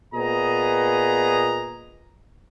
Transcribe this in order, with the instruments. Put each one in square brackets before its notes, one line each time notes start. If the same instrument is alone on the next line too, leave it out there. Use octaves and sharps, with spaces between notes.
[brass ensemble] A#2 B3 G#4 D#5 A#5